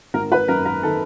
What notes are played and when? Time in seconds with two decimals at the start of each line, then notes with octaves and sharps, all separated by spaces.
0.14 G#1 A#4
0.32 B4
0.48 F#2 A#4
0.65 A#4
0.83 D#3 A4